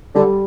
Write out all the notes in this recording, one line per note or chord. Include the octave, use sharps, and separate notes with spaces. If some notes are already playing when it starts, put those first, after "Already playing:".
D3 G3